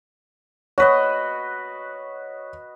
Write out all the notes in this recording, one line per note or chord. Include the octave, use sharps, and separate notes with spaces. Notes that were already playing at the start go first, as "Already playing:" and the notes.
F#4 B4 C#5 D#5